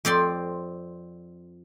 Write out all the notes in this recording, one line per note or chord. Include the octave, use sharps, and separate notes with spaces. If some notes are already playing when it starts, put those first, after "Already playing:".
F2 C4 D5 C6